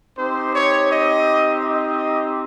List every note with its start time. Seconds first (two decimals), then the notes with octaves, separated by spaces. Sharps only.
0.17 C4 D#4 G4 C5
0.54 C#5
0.90 D#5
1.64 D#5